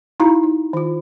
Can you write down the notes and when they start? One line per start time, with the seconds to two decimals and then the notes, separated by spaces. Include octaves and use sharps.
0.20 D#4 E4 F#4 F5 A#5 B5
0.43 D#4
0.73 D#3 F4